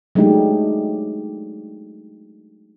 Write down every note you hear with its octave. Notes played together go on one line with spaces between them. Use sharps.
F#3 G#3 A3 D4 D#4 G4